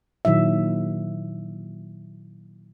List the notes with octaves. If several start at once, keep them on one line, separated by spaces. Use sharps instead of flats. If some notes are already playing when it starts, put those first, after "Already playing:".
A#2 D#3 F#3 E4 E5